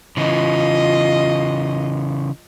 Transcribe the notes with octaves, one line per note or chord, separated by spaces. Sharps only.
C#3 E3 F4 D#5